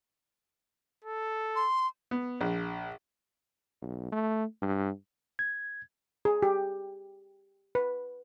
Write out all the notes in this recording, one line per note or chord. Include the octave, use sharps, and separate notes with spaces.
A4
C6
B3
A#1
B1
A3
G2
G#6
G#4
G4
B4